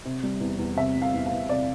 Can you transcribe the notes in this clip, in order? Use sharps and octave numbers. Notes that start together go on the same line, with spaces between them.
C3
G3
E2
E2
C3 E5
G3
F5
E2
F5
E2
C3 D5